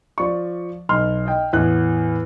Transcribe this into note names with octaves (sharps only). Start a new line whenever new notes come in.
F3 D5 C#6
B1 C6 F6
D#5 G5
E2 A2 B3 F#6